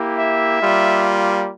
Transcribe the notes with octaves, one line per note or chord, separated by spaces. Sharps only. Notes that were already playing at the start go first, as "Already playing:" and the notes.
Already playing: A#3 E4 G4
E5
G3 A#3 F4